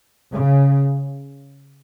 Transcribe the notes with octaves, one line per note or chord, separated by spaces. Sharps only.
C#3